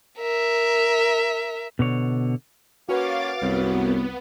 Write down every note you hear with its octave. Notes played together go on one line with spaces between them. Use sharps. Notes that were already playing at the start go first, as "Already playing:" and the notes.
A#4 E5
B2 D3 C#5
A#3 C#4 F#4 B4 F5 F#5 D6 A6
C2 F#2 B3